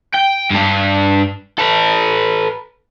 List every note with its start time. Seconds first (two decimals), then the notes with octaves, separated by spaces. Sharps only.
0.14 G5
0.51 G2 D4
1.59 A4 B4